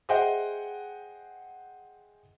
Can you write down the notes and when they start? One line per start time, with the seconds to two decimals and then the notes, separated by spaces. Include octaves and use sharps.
0.09 G#4 C5 D#5 E5 F#5 G5